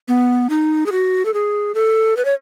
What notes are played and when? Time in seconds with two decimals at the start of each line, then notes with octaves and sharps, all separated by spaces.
0.08 B3
0.50 D#4
0.86 G#4
0.92 F#4
1.26 A4
1.34 G#4
1.75 A4
2.17 B4
2.25 C#5